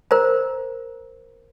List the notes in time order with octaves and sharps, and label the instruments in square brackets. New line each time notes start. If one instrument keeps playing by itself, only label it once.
[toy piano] A#4 C5 A#5